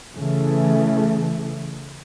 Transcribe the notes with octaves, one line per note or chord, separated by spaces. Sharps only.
C#3 E3 A3